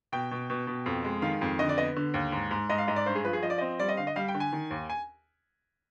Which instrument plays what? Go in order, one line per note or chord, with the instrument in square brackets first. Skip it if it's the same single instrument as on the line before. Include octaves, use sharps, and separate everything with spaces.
[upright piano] B2 G5
B2
B2
B2
F2
G#3
D#3 F5
F2
D3 D#5
D5
B3 D#5
D3
D#2
G#2
G#2
G#2 D#5
F5
G#2 D#5
D5
G2 C5
G#4
F3 B4
G#4
F3 D#5
D5
C4 D#5
G3 D5
D#5
D3 F5
D#5
G3 F5
G5
D3
G#5
D#3
D#2
G#5